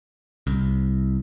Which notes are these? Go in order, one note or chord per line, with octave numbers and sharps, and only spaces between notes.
C2